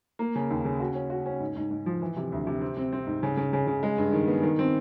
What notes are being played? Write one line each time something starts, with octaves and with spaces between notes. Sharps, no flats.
A#3
C#3
D#2
C#3
F#4
C#4
F#4
C#4
G#2
G#2
G#2
F3
E3
C3
D2
C3
C4
C4
C4
G#2
C#3
C#3
C#3
C#3
G#3
G2
D#3
B3
D#3
C4